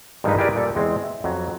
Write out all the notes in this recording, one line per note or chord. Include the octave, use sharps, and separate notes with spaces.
G2 D#3 F3 G#3 D#4 B4
E4 G4 G#4 A#4 B4 D5
A#2 G3 A4
E2 G#3 C4
E5
F2 F#3